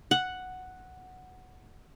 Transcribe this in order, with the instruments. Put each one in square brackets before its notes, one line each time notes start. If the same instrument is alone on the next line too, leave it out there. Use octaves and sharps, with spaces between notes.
[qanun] F#5